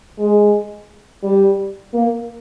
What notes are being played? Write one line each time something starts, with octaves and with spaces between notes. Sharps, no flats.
G#3
G3
A#3